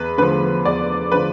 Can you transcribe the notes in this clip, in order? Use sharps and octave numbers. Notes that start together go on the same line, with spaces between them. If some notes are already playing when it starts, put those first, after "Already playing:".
Already playing: E2 B4
D3 F3 B4
E2 D5
D3 F3 B4